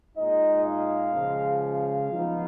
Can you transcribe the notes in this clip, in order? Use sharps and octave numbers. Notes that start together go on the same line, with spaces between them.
A#2 G#3 D#4 D#5
F5
C#3 F3 G#3
F5
F3 B3 D#4